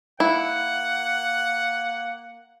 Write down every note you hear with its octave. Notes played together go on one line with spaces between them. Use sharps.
A#3 E4 F#5